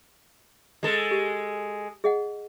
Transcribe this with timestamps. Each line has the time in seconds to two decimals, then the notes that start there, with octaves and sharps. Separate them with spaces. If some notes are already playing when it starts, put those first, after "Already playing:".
0.83 G#3 A4
1.11 G4
2.04 G#4 D#5 F#5